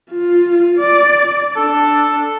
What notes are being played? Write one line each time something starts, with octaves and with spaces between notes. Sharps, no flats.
F4
D5
D4 A4